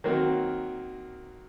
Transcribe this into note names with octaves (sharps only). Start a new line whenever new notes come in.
D#3 F#3 A#3 C4